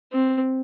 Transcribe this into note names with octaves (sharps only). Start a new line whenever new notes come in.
C4